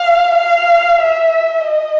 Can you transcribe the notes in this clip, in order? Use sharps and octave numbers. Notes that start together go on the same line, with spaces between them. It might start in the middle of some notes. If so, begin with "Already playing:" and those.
Already playing: F5
F5
E5
D#5